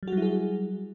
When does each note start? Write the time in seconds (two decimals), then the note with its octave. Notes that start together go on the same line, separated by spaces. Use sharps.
0.03 F#3
0.08 F#4
0.12 G3
0.17 E4
0.22 G#4